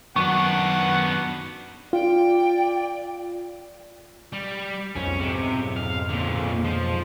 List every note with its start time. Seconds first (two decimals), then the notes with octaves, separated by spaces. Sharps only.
0.16 F#2 D#3 F#3 B3 D4 F#5 C#6
1.93 F4 D5 G5
4.32 G3
4.96 B1 F2 G#2 C#4
5.21 C3
5.76 F5
6.09 A#2 D3
6.64 F3